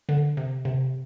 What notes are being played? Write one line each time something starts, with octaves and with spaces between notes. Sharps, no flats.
D3
C3
C3